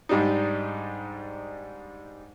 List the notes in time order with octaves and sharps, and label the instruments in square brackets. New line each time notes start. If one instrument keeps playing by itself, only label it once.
[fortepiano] G#2 G3 D4 D#4